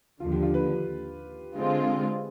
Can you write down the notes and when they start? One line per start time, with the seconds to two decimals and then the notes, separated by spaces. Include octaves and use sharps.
0.20 D#2 D3 F3 F4
0.32 G4
0.42 F4
0.54 B4
1.55 D3 G#3 C4 F4